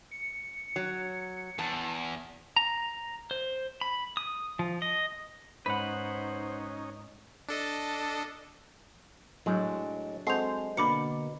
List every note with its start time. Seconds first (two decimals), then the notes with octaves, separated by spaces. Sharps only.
0.11 C#7
0.76 F#3
1.59 E2 A5
2.56 A#5
3.31 C5
3.81 B5
4.17 D#6
4.59 F3
4.82 D#5
5.66 G#2 C#4 D#4 B4 C5 F#5 B5
7.49 D4 A4 D#5
9.46 A2 F#3 G#3 D4
10.27 G#3 C4 F#4 A4 C5 C7 F7
10.77 B2 D3 A#3 A#4 B5 D6 C#7